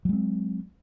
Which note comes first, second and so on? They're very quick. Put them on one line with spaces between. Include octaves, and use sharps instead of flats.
F#3 G#3 C4